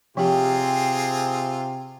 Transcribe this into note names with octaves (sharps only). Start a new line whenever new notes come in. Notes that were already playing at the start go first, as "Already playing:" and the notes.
C3 F3 C4 F4 G4 G#4 G5